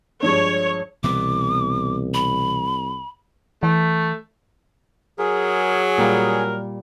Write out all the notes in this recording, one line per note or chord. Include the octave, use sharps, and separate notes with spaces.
G2 F3 G#3 C#5
C2 B2 E3 B3 D6
B5
E3 A3
F#3 G#4 A#4
A#2 G3 A#3 A#4